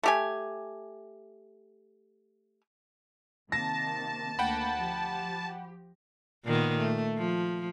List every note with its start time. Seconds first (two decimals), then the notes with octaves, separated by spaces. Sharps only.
0.03 A3 G4 G#5
3.52 C3 D#3 A#3 A5 A#6
4.39 D2 A#3 F#5 G5 B5
4.79 F3 G4
6.45 A#2 D#3 B3
6.78 A3
7.17 F3